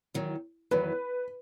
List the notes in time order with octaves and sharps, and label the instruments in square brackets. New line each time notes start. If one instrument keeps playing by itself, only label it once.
[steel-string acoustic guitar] E2 D#3 F#3
[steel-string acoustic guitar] E2 D#3 F#3 [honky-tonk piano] B4